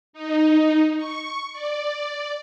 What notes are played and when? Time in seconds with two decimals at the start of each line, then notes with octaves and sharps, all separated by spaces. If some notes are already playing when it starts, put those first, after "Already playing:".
0.13 D#4
0.97 C#6
1.53 D5